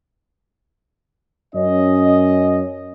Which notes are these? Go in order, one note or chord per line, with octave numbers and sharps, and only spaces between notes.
F#2 C#4 D#5